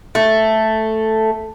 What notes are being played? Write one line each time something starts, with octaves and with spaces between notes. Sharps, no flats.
A3